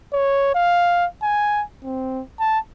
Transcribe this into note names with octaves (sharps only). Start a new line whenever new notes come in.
C#5
F5
G#5
C4
A5